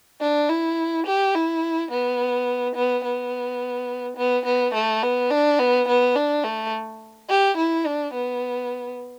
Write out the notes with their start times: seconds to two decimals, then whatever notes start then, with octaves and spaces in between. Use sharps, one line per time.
0.21 D4
0.49 E4
1.06 G4
1.35 E4
1.91 B3
2.75 B3
3.04 B3
4.17 B3
4.46 B3
4.74 A3
5.03 B3
5.31 D4
5.59 B3
5.88 B3
6.15 D4
6.44 A3
7.29 G4
7.57 E4
7.86 D4
8.14 B3